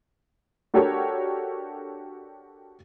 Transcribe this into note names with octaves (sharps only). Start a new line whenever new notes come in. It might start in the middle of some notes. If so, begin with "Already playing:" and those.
D4 F#4 G4 A4 A#4 C#5